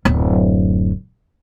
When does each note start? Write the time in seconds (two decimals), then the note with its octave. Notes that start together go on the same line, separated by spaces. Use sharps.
0.05 D1 F#2